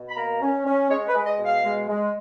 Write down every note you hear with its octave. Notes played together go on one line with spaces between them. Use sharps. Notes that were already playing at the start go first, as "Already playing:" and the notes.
Already playing: B2
B5
A#3 A#5
C#4
C#4
G#3 C#5
B4
G#3
D#5
B2
F5
G#3
G#3